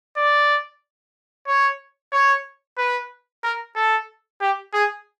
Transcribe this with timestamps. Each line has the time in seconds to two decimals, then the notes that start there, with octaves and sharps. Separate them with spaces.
0.17 D5
1.47 C#5
2.13 C#5
2.78 B4
3.43 A#4
3.76 A4
4.41 G4
4.74 G#4